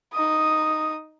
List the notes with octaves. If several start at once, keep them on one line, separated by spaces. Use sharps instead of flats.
D#4 D#6